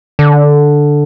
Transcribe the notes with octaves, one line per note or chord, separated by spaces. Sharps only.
D3